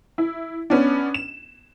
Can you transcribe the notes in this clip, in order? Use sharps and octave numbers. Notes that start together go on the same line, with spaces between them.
E4
B3 C#4 D4
E7